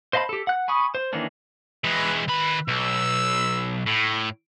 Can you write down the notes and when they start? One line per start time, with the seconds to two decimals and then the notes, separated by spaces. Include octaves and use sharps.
0.13 C5 D#5 F5 A5 B5
0.29 G4 A4
0.47 F#5 F#6
0.68 G#5 B5 C#6 D#6
0.95 C5
1.13 D#3 E3 A#3 C#4 D4
1.84 E3 G#3 B4
2.28 D#3 B4 B5
2.68 B1 E6
3.87 A2